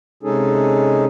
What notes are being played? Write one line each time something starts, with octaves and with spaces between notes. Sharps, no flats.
C3 G#3 C#4 D#4 G#4 A4